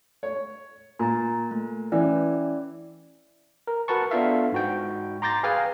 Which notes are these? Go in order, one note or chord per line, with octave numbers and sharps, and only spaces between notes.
C#5
A#2 G#5 A#5 A6
A3
E3 C#4 E4 D5
A#4
F#4 A#4 B4 A5 C#6
B3 D4 F4 A4 E5 F5
G#2 F#4 G5
A#5 C6 D6 G6 A6 A#6
G#4 B4 F5 G5 G#5 F6